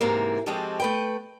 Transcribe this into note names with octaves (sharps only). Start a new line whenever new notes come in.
G#2 C3 E3 A#3
F3 G#3 C4 F#4 G4 A4
A3 B4 G5